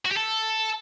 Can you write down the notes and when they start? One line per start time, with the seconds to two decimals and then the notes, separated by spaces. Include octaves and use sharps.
0.05 F#4
0.11 G4
0.16 A4